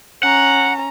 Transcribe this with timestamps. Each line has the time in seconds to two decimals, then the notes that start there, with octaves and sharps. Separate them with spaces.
0.23 C#4 F#5 A#5